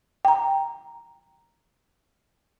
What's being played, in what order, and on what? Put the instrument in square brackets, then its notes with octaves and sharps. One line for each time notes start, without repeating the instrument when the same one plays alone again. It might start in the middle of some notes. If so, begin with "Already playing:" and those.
[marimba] G5 A#5